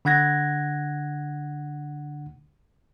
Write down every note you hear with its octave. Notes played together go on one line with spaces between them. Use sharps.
D3 D4 F#5 F#6 G#6 A#6